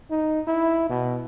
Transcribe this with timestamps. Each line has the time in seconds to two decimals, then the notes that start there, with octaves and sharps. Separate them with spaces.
0.10 D#4
0.47 E4
0.89 B2